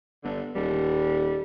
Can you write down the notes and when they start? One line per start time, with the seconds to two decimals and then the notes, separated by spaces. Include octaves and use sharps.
0.24 G1 D3
0.55 D#1 G3